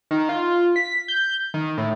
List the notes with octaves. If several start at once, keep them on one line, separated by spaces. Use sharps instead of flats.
D#3
F4
B6
G6
D#3
A2